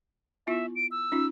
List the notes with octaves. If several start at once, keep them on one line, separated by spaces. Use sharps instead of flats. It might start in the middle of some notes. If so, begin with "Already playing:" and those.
B3 E4 F4 E5
D7
E6
C#4 D#4 F4